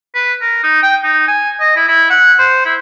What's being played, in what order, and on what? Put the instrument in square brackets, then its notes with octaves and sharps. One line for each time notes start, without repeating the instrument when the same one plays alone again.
[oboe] B4
A#4
D#4
G5
D#4
G#5
D#5
E4
E4
F#5
C5
E4